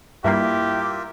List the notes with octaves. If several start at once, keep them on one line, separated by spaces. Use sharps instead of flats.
G2 G3 A#3 E4 F4 G4 A#4 E5